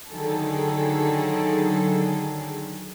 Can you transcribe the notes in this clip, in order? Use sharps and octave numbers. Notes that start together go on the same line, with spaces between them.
D3 D#3 F#3 G#4 A4